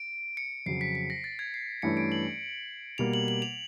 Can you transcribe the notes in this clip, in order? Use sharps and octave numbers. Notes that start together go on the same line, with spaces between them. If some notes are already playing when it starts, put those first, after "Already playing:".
Already playing: D7
C#7
F2 C#3 F#3 C7
B6
B6
A#6
A6
G#6
C7
G2 E3 A3 C#4 E4 C#7
D7
F#7
B2 G3 A#3 F7
F#7
F#7
F7